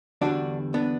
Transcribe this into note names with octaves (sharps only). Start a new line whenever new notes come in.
E2 D3 G3 D4 F#4
B3 D4